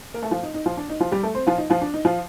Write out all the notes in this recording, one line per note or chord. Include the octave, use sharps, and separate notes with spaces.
A#3 A#4
A3 A4
F3 F4
D#4
D#4
F3 F4
D4
D#4
F3 F4
G3 G4
A3 A4
C4 C5
F3 F4
D#4
F3 F4
D4
D#4
F3 F4